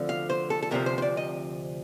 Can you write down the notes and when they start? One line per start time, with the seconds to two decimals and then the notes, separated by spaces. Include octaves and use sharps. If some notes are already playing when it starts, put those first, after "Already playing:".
Already playing: D2 D3 F3 C4
0.09 F5
0.30 C5
0.50 A4
0.63 A4
0.71 D2 C3 F3 C4 A#4
0.86 C5
0.98 C5
1.02 D5
1.17 D#5